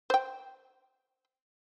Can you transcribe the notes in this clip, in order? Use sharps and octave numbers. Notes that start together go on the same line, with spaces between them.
C5 G5